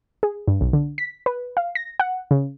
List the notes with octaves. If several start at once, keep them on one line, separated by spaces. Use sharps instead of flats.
G#4
G2
B1
D3
B6
B4
F5
A#6
F#5
C#3